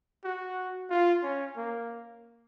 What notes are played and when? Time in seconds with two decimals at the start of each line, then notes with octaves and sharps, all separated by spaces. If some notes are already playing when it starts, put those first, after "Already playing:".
0.24 F#4
0.90 F4
1.23 C#4
1.57 A#3